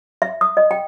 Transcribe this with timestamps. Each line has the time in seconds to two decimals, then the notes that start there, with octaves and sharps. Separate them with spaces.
0.22 E5
0.41 D#6
0.57 D#5
0.71 G5